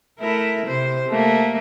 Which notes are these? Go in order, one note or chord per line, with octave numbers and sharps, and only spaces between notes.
A3 E4 A#4
C3 C5
A3 A#3